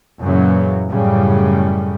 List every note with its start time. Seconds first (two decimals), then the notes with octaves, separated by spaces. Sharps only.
0.21 F#2 A#2 C#3 E3 F#3
0.90 F#2 A2 C#3 G3